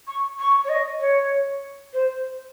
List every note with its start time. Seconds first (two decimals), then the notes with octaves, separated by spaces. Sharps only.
0.07 C#6
0.39 C#6
0.65 C#5
0.69 D#5
1.01 C#5
1.93 C5